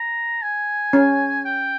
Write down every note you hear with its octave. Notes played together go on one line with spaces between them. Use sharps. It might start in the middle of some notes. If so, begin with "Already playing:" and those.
Already playing: A#5
G#5
C#4
G5